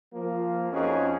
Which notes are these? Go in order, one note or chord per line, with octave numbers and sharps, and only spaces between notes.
F3 A#3
F2 C#4 D#4 F#4 G#4